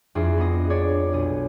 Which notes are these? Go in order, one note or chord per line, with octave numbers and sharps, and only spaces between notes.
F2 D4 E4 G#4 E5 C6
B3 D#5
D4 G#4 C#5 D5
B1 G#4 D#7